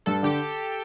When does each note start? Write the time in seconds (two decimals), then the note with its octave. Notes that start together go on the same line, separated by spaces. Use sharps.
0.06 G2 A4
0.23 D3 G4